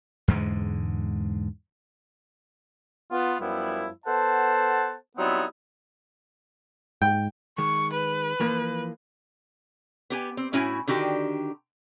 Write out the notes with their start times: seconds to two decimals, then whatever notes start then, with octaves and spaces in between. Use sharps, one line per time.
0.28 E2 G#2 D3 G#3
3.11 B3 F4
3.40 F#2 F3 G3 B3 E4
4.06 B3 A4 C5 F#5 A5
5.18 F#3 G3 B3 C4 D#4 E4
7.02 G#2 G5
7.58 D#3 G#3 C#6
7.93 B4
8.40 E3 F3 A#3
10.10 B3 G4 G#5
10.37 C4
10.53 A2 C#4 E4 F#4 G#5
10.87 D3 D#3 F#4 G4